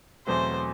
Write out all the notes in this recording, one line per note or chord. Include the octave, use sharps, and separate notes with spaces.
E2 B2 F#3 A3 C4 C5